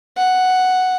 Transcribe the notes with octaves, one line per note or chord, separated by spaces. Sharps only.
F#5